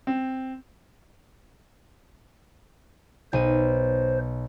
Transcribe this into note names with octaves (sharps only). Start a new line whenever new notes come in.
C4
B1 C5 D#7